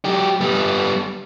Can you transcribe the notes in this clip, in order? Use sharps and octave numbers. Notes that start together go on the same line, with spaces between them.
F#3 G4
G3 B3